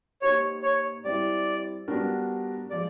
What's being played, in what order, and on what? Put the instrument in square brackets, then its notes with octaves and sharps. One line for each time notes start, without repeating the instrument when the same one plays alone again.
[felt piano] A#3 D#4 G4 C5 [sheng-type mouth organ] C#5
[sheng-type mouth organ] C#5
[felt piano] G3 C4 E4 [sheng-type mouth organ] D5
[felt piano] G3 B3 D4 F#4 A#4
[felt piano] F3 G#3 [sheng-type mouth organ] D5